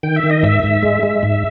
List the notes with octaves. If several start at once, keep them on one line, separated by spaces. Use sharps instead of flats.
D#3 G5
E5
D#3
D#5
G#2 E5
G#2
G#3
G#3
G#2